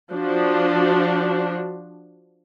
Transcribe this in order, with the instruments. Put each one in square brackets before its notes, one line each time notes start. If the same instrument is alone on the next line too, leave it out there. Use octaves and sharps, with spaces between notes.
[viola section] F3 D4 F#4